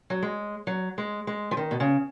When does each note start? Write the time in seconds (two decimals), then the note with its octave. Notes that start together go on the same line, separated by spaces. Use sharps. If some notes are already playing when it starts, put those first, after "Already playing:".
0.10 F#3
0.23 G#3
0.67 F#3
0.98 G#3
1.27 G#3
1.51 F3
1.57 D#3
1.71 B2
1.80 C#3